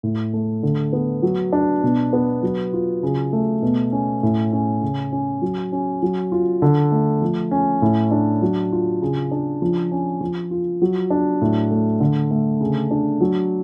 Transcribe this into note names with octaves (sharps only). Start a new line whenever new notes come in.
A2
A3
D3
B3
F#3
D4
B2
B3
F#3
F4
C#3
A3
B2
C#4
A2
C#4
C#3
C#4
F#3
C#4
F#3
F4
D3
A3
F3
C#4
A2
D4
F#3
F4
C#3
D4
F3
C#4
F3
F4
F#3
D4
A2
A3
D3
A3
C#3
D4
F#3